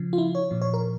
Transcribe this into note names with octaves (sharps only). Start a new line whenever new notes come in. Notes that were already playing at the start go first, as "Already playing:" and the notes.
Already playing: C#3 F3
F4
E4
C#5
A#2 F3
C#5
A#4